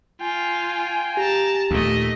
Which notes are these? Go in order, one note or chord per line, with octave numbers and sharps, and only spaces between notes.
F4 F5 G5 G#5
G4 A5 A#5
D#2 A#2 A3 D#5